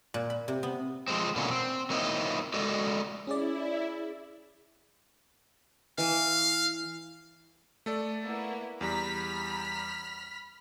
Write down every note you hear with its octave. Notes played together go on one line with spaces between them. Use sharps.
A#2
B5
C3
B3
F3 G#3 C4
B2 D3 E3 F#3 A#3 C#4
C4
F#3 A#3 C4 D#4 E4 D#5
G#3 F#4 A4 D5 D#5
C#4 E4 G#4 D5
E3 F5
A3 A4 D5
A#3 B3 E4
E2 G3 A#5 B5 F6 B6